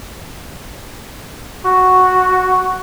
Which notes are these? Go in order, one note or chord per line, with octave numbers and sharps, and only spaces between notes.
F#4